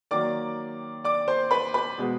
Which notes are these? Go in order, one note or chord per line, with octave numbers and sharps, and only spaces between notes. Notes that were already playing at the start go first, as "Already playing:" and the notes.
D#3 F#3 A#3 D5 D6
D5 D6
C5 C6
B4 B5
B4 B5
B2 G#3 B3